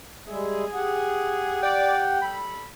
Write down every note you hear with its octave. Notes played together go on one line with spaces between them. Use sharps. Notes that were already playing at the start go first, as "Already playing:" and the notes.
G3 G#3 G#4 E5
G4 F#5
D5 G5
G3 A4 B5